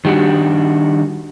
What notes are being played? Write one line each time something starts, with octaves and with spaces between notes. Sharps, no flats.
D#3 G3 D4 F#4